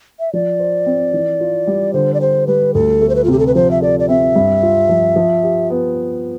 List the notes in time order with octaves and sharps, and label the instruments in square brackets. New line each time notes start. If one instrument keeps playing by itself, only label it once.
[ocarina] E5
[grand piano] F3 [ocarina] D5
[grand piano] C5
C4
E3
F4
G3
[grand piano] D3 [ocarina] C5
[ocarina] D5
[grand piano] G4 [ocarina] C5
[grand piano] G3 [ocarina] B4
[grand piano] D2 [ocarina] A4
[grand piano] A3
[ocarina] C5
B4
F4
[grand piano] C3 [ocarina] G4
[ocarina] A4
B4
[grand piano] F3 [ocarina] C5
[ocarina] E5
[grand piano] A4 [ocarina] D5
[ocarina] D5
[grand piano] C4 [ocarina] E5
[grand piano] G2
F4
F3
F3
G4
B3